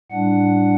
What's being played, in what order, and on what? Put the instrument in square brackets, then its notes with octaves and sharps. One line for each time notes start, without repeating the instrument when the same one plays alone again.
[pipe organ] A2 G3 D4 F#5